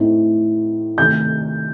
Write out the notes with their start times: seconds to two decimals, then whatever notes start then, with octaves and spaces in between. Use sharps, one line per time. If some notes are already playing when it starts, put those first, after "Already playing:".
Already playing: A2 A3 C4 D#4
0.98 C3 D#3 A3 G6